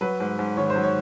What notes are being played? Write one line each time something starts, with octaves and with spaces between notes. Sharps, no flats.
F#3 B4
G#2
G#2
D#3 C#5
C5
F#3
C#5